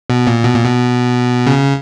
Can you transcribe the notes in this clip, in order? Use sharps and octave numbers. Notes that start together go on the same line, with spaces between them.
B2
A#2
B2
A#2
B2
C#3